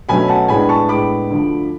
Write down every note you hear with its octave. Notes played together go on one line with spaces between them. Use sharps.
B2 F#3 A3 C#4 G#5 B5
F#5 A5
A2 G#3 B3 D4 G#5 B5
A5 C#6
A2 G#3 B3 D4 B5 D6
D2 D3 F3